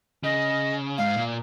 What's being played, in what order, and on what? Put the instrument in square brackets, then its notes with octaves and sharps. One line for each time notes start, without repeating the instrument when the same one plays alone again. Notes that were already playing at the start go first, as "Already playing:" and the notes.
[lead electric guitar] C#3 [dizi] D#5
[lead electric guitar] G#2 [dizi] F5
[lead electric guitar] A#2